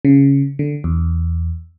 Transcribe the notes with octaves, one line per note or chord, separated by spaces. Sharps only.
C#3
D3
E2